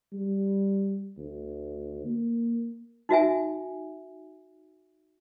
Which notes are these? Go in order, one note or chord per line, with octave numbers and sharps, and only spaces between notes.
G3
D2
A#3
D#4 F#4 E5 G#5